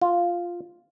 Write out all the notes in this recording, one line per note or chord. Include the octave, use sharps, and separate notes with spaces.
F4